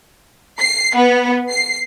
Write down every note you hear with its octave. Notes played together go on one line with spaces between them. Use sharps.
C7
B3
C7